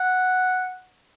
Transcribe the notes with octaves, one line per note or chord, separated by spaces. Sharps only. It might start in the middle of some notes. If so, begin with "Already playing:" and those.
Already playing: F#5